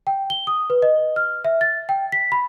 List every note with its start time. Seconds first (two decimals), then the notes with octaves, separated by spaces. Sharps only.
0.07 G5
0.30 G7
0.47 D#6
0.70 B4
0.82 D#5
1.16 F6
1.45 E5
1.61 A6
1.89 G5
2.12 B6
2.32 B5